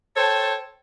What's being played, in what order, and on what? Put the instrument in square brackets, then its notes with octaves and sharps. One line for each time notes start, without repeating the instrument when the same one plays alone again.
[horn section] A4 C5 C#5 G5 A5